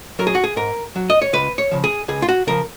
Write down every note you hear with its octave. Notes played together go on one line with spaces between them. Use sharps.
F#3 A#4
G#4
F#4
G#4
G#2 A#4
F#3
D#5
C#5
C#2 B4
C#5
C#3 F3
G#4
C#2 G#4
F4
F#4
C#3 F3 A#4